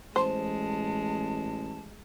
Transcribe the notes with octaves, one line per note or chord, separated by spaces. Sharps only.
A1 G#3 C5 A5